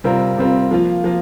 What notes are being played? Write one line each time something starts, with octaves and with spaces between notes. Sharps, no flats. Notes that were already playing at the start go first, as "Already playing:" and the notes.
C3 G3 C4 F4 A#4
C3 G3 C4 F4 A#4
F3 A#3 F4
F3 A#3 F4